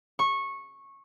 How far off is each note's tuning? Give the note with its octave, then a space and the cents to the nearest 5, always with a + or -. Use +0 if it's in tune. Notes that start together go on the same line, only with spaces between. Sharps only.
C#6 -15